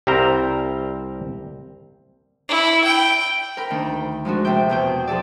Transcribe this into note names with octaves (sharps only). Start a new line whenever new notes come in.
C2 G3 C4 A#4 C5 A#5
E4
G5
A#4 G5 B5
D2 D#3 D4
F3 G#3 D4 F#4
C3 D4 E5 G5
E2 B2 G5
F3 G#4 A4 D5